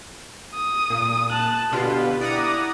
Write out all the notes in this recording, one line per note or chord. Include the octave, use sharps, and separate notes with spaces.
D#6
A#2
A5 F#6
B2 D3 F4 G4 B4
E4 D5 F#5 A#5 D#6